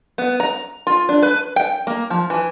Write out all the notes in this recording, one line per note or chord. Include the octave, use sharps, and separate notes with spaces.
B3
A#5
F4
D4
B4
G5
A#3
F3
E3